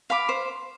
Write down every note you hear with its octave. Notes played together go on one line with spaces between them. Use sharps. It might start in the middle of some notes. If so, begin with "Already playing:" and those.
F5 B5 D6
C5